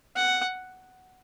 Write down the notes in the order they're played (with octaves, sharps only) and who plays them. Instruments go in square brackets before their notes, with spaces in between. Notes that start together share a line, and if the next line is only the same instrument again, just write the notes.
[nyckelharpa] F#5